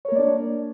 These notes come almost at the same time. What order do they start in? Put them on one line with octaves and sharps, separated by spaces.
C#5 A#4 A#3 D5 D4